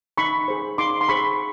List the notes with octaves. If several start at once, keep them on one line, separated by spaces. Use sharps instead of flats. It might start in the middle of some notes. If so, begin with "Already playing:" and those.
D#4 B5 C#6
G#4 C5
D#4 C6 D6
C6
G#4 C5 B5 C#6